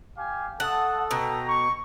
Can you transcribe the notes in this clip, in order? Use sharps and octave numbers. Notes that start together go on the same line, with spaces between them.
G4 F5 G#5
A3 A4 F#5 A5 D#6
B2 G5 A#5
C#6